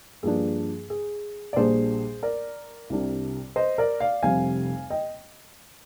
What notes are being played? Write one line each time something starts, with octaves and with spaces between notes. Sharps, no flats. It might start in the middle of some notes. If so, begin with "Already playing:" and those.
G2 F3 A#3 D4 G#4
G#4
D5
A#1 A#2 G3 D4 G#4 C5
A#4 D5
C2 C3 G3 D4
C5 D#5
A#4 D5
D5 F5
F1 F2 C3 G3 F5 G#5
D#5 G5